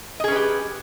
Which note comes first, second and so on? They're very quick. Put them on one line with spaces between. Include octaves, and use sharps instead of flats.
D#5 G#4 C#4 B4 G4